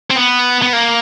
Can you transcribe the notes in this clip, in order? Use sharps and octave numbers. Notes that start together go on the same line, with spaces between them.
C4
B3
B3
A#3